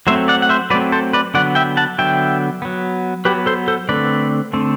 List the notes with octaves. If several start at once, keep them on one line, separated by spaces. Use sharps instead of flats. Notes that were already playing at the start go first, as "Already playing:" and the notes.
F#3 A3 C4 C5 E5
D5 F#5
F#5
C5 E5
F#3 A3 C4 B4 D5
A4 C5
B4 D5
D3 F#3 B3 D5 F#5
E5 G5
F#5 A5
D3 F#3 B3 E5 G5
F#3 B3
F#3 B3 G4 B4
A4 C5
A4 C5
D3 A3 C4 B4 D5
D3 A3 C4